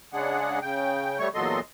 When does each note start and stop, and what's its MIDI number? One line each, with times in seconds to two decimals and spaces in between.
0.13 0.59 49
0.13 0.59 56
0.13 0.59 62
0.13 0.59 68
0.13 0.59 78
0.62 1.19 49
0.62 1.19 79
1.19 1.29 55
1.19 1.29 57
1.19 1.29 73
1.19 1.29 85
1.35 1.60 40
1.35 1.60 46
1.35 1.60 54
1.35 1.60 69
1.35 1.60 75
1.35 1.60 84